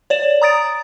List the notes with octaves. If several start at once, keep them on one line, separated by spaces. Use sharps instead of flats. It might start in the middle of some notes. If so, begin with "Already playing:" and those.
C#5 D5 E7
A#5 D#6 A6 D7